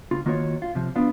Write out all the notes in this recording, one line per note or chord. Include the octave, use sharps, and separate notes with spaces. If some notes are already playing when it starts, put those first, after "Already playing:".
C#2 F4
D#3 A#3 F4 F#4 B4 C#5
F4
C3 F3
B3 D4 F4